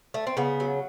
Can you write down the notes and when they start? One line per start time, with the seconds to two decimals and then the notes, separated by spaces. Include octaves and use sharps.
0.14 A3
0.27 C4
0.37 C#3 B3
0.60 F#3